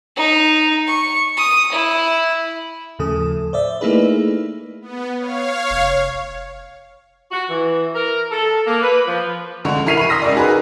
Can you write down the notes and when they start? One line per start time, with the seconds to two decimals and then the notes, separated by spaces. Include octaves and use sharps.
0.16 D#4
0.87 C#6
1.37 D#6
1.71 E4
2.99 D#2 A2 C#3 F3 A4 D#6
3.53 C5 D5 E5
3.81 A3 A#3 D#4 E4 G#4 B4
4.81 B3
5.18 C#5 F5
5.70 F1
7.31 F#4
7.49 E3
7.95 A#4
8.31 A4
8.66 A#3
8.82 B4
9.07 F3
9.65 C#2 D3 C#6
9.86 E3 A#4 E5 C7 D#7 F7
9.97 B5 C#6 D#7
10.09 C6 D#6 E6 A#6 B6
10.22 C#2 A#4 D5
10.35 D#4 F#4 G#4 A#4 B4